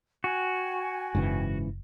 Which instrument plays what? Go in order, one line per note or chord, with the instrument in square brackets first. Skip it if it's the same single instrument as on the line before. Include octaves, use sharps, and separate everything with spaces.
[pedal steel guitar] F#4 [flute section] G5 G#5
[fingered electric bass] F#1 [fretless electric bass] G#2 C#3 E3